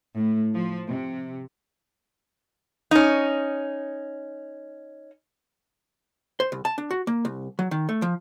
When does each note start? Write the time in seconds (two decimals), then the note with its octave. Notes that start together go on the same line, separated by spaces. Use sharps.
0.17 A2
0.54 F3
0.89 C3
2.91 C#4 D#4
6.40 C5
6.52 C2
6.65 A5
6.78 D4
6.91 F#4
7.07 A#3
7.25 C2
7.59 F#3
7.71 D#3
7.89 A3
8.02 F3